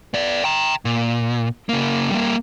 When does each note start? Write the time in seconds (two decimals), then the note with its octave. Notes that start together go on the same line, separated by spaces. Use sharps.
0.14 B3 D5
0.44 G5 A#5
0.85 A#2
1.69 C#3 A#3
2.11 G3 A#3